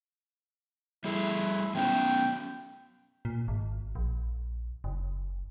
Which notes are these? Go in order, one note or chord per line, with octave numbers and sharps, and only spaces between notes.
G3 E4 G#4 A4
F#3 B3 C#4 G5
A#2
G#1
A#1
F#1